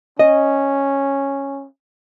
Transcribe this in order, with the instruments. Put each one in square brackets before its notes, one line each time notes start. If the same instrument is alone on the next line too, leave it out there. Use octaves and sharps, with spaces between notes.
[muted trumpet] C#4 [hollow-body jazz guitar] D#5